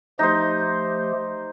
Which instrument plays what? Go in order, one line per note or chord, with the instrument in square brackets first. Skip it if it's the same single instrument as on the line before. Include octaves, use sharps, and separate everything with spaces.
[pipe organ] F3 A3 G4 [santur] D#4 C5